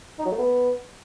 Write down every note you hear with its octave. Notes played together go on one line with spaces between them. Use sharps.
D#4
F#3
A3
B3